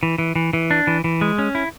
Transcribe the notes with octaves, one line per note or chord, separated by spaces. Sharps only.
E3
E3
E3
E3
D4
E3
E3
G#3
C#4
E4